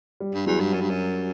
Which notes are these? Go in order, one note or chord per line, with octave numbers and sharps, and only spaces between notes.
G3
G2
E2 F#3
G2
F#2
G2
F#2